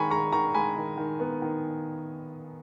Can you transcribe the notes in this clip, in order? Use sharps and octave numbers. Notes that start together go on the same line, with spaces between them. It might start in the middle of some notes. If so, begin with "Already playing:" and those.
Already playing: D#3 G#3 G#5 A#5 B5 C#6
G#3 A#5 C#6
D#3 A#5 C#6
G#3 G#5 B5
D#3
D#3
B3
D#3